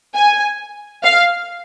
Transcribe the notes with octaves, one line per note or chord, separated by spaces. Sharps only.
G#5
F5